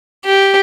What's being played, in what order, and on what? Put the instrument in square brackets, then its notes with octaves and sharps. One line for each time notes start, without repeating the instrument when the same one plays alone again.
[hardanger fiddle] G4